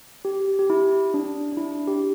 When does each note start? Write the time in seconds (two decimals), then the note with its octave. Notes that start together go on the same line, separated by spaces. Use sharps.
0.25 G4
0.59 G4
0.70 E4
1.14 D4
1.52 D4
1.57 E4
1.87 G4